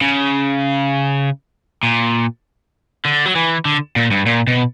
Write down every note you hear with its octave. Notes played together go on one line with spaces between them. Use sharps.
C#3
A#2
D3
F#3
E3
D3
A#2
G2
A#2
B2